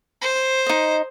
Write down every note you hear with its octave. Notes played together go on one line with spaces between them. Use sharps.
C5
D#4 D#5